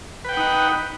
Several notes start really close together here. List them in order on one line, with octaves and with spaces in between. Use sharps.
B4 G5 F#5 D#4